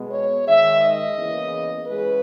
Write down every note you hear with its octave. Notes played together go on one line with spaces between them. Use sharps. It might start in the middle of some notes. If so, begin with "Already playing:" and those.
Already playing: B2 G#3 B3
C#5
G#2 D#3 G#3 E5
D#5
E2 C#3 E3 A#3
C#3 E3 G#3 B4